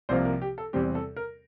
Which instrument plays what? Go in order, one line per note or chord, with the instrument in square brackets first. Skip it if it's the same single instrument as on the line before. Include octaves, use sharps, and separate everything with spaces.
[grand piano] C2 C3 F3 A#3 C5
A#4
G4
A4
E2 C3 G3 C4 G4
A4
A#4